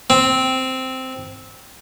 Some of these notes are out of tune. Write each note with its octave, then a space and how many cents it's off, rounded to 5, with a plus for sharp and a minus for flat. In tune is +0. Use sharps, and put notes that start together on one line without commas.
C4 -5